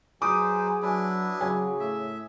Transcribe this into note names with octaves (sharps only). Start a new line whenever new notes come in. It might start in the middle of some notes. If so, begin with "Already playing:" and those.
F#3 D#4 G#4 B4 C5 D6 D#6
F#3 D4 E4 B4
C#3 F#3 G#5
A2 E5